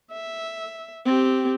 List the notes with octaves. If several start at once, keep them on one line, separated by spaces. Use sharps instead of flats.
E5
C4 G4